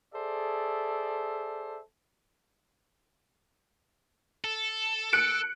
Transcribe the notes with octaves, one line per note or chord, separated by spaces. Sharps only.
G#4 A4 C5 D5 E5
A4
F#6 C#7 D7